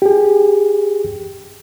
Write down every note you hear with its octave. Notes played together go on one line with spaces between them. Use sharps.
G4 G#4